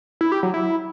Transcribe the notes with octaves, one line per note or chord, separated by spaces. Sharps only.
E4
G4
F#3
E4